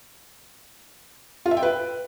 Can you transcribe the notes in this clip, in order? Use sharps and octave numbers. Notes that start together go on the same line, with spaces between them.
F4
E5
G5
B4